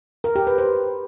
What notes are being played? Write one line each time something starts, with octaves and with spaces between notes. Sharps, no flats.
A#4
G4
B4
C5